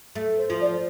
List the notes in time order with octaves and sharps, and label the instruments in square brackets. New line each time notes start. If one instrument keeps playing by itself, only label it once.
[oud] A3
[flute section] C5
[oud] F3
[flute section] D5